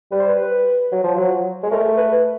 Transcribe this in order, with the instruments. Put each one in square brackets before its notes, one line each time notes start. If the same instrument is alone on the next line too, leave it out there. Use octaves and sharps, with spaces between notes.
[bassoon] G3 [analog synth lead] B4
[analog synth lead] C5
B4
[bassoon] F#3
F3
F#3
G#3
[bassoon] A3 [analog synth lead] A#4
[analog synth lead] B4